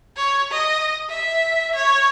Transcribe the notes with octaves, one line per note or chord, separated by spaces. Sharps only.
C#5
D#5
E5
C#5